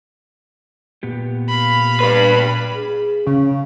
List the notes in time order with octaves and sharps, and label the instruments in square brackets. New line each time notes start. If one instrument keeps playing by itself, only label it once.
[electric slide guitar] A#2 B3 G4
[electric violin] F5 B5
[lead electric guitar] G2 B4
[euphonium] G#4
[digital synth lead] C#3 [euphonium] C#4